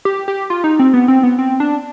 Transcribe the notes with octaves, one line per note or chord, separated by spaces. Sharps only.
G4
G4
F4
D#4
C4
B3
C4
B3
C4
D4